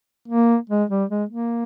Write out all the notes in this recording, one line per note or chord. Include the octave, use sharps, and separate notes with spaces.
A#3
G#3
G3
G#3
A#3